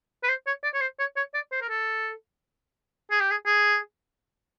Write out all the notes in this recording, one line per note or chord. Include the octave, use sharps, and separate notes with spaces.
B4
C5
C#5
D5
C#5
C5
C#5
C#5
D5
C5
A#4
A4
G#4
G4
G#4
G#4